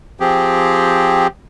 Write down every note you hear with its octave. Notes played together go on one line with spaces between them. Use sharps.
F3 C4 G4 G#4